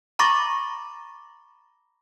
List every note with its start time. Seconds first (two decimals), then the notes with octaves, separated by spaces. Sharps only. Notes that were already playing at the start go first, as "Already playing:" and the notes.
0.19 A#5 B5 C#6 D6 A6 A#6